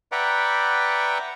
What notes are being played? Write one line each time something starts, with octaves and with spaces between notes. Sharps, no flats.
B4 D5 E5 F#5 G5 A#5